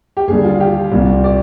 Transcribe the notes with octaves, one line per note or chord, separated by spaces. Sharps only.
G4
D#2 D3 G3 G#4
F4
F4
G4
C2 A#2 G3
D5